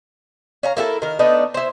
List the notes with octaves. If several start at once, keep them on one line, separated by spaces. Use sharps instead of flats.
C#4 F5 A#5
A#3 E4 F#4 A4
D#3 A#4
A3 B3 D4 D#4
E4 C5